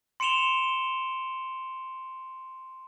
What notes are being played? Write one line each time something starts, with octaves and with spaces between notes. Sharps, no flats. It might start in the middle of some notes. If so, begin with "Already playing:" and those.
C6 C#7 D7 E7 F7 G7